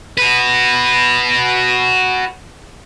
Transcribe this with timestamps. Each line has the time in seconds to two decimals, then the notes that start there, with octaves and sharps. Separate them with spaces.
0.18 F#4 B4